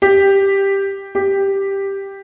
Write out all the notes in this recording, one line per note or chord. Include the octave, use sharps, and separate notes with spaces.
G4
G4